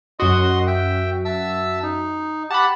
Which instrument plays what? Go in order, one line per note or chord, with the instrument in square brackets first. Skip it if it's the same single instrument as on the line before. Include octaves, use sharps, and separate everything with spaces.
[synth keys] F#2 F#4 [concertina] D#5 C6 D#6
[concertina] E5 G5
E5 A5 E6
D#4
[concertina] G4 F#5 [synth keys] A5 B5